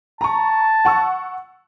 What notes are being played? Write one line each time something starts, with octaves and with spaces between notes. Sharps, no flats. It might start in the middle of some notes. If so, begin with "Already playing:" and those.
A5 A#5 C#6
F#5 C#6 E6